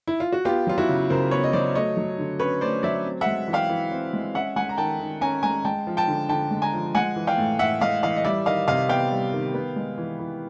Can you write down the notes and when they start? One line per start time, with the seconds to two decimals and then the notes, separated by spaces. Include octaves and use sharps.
0.07 E4
0.20 F4
0.33 F#4
0.45 B3 F4 G4
0.67 F#3 F4
0.78 E4 F#4
0.89 C#3
1.10 C#3 A#4 C5
1.31 B3 B4 C#5
1.43 D#5
1.53 F#3 C5 D5
1.75 A3 C#5 D#5
1.97 F#3
2.18 D3
2.40 C#4 B4 C#5
2.61 A3 C5 D5
2.83 F#3 D5 E5
3.05 C4
3.21 G#3 E5 F#5
3.48 E3
3.53 F5 G5
3.69 E3
3.92 C4
4.13 G#3
4.35 C#4 E5 F#5
4.56 G#3 F#5 G#5
4.69 A#5
4.78 D#3 G5 A5
5.00 D#3
5.21 C#4 G#5 A#5
5.43 G#3 G#5 A#5
5.65 G#3 G5 A5
5.87 F3
5.97 G5 A5
6.08 D3
6.29 D3 G5 A5
6.51 G#3
6.62 G#5 A#5
6.73 F3
6.94 G#3 F#5 G#5
7.16 E3
7.27 F5 G5
7.38 A2
7.59 A2 E5 F#5
7.81 G#3 D#5 F5
8.03 E3 D#5 F5
8.17 D#5
8.24 G3 D5 E5
8.46 D#3 D#5 F5
8.67 C3 D#5 F5
8.89 B3 F5 G5
9.11 G3
9.33 D#3
9.54 B3
9.76 G#3
9.98 E3
10.19 E3